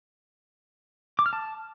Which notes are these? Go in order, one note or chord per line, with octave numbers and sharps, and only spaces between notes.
D6
F6
A5